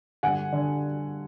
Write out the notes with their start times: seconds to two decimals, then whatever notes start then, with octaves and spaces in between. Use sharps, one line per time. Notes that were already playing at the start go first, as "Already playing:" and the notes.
0.23 G2 D3 F#5 G#5
0.53 D3